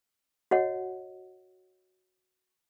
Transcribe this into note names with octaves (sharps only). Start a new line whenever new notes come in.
F#4 C#5 D#5 F#5